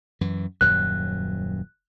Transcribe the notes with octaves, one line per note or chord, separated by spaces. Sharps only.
F#2 E3
D#1 F#2 F#3 F#6